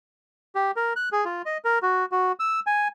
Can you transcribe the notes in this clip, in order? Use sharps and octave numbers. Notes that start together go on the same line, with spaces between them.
G4
A#4
F#6
G#4
F4
D#5
A#4
F#4
F#4
E6
G#5